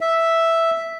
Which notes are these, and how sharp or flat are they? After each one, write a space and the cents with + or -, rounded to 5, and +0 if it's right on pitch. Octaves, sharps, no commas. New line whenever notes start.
E5 +0